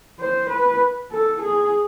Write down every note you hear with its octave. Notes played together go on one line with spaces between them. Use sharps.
C5
B4
A4
G#4